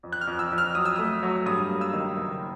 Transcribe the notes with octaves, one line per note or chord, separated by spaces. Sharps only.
F2
F#6
F6
F2
E6
F2
F6
F#3 D#6
E6
A3 D#6
F#3
G2 D#6
A#3
E6
D#3
F#1